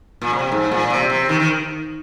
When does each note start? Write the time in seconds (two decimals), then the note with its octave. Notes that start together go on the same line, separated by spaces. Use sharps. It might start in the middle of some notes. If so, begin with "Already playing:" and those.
0.22 A#2
0.33 C3
0.52 G#2
0.71 A#2
0.90 C3
1.10 C3
1.29 D#3
1.40 D#3